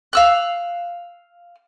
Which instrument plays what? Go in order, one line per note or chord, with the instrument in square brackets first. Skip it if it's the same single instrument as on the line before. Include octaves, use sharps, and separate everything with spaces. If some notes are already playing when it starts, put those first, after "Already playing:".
[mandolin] F5 E6 F#6